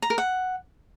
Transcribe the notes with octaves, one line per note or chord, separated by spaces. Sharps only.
A#5
A#4
F#5